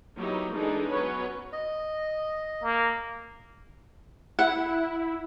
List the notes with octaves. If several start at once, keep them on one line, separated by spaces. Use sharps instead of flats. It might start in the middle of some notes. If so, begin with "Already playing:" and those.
F#3 A#3 B3 D#4 E4 G4
E3 G#3 D4 D#4 G#4 A4
F#3 B3 C#4 B4 C#5
D#5
A#3
E4 F#5